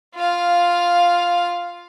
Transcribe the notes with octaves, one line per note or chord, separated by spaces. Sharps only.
F4 F5